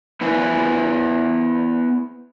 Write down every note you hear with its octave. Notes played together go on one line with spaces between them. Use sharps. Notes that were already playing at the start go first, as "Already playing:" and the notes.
B3 E4 B4 C5 G#5